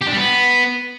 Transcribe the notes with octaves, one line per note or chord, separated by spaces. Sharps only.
G4
D4
G3
B3